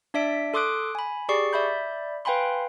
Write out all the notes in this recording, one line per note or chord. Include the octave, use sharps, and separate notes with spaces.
D4 D5 E5 B6 D7
A4 C6 D6 D#6 F#6 D7
G#5 B5
G4 G#4 D5 C#6 C7
D5 E5 B5 G6
B4 F5 G5 G#5 B5 C6